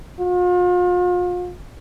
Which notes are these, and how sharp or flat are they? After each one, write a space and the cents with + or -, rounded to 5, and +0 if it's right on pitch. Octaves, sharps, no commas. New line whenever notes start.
F4 +40